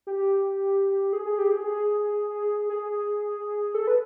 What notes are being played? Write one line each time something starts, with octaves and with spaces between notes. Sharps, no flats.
G4
G#4
G#4
G4
G#4
G#4
G#4
A4
B4